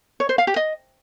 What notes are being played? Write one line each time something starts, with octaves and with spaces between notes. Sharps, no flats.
C#5
C5
F5
G4
D#5